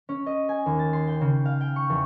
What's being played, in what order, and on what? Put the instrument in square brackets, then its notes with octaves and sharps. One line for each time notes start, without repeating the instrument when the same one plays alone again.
[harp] C#4
D#5
G#5
D#2
A6
C6
G5
C#3
F5
G5
C#6
E2